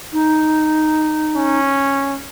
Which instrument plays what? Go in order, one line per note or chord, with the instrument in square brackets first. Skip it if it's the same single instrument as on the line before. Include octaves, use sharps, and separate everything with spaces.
[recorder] D#4
[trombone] C#4